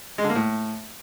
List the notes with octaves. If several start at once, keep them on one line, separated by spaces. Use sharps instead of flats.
G#3
D3
A#3
A2